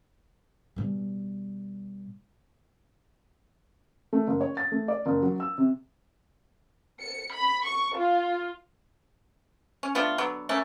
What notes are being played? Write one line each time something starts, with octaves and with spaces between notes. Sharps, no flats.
B2 G3
A3
F#1
C#5
A6
A3
D5
F#1
F#3
E6
C3
C#7
B5
C#6
F4
C#4
A3 B3 D4 F4
D3 F#3 B3
A3 A#3 C#4